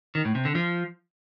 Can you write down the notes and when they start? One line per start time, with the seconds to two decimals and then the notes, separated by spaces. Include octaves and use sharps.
0.15 D#3
0.25 A2
0.35 C3
0.45 D3
0.55 F3